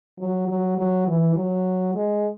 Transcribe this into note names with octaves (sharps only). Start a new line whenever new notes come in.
F#3
F#3
F#3
E3
F#3
G#3